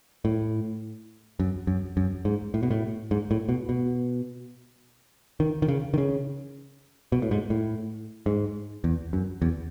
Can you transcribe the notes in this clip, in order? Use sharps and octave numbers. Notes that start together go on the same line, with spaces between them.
A2
F#2
F#2
F#2
G#2
A2
B2
A2
G#2
A2
B2
B2
D#3
D#3
C#3
D#3
C#3
B2
A2
G#2
A2
G#2
E2
F#2
E2